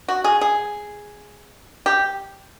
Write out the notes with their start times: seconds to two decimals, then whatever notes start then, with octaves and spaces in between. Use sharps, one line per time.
0.08 F#4
0.24 G#4
0.41 G#4
1.86 G4